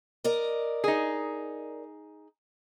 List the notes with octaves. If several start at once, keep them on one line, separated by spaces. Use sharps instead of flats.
A#4 D5 D#5
D#4 G#4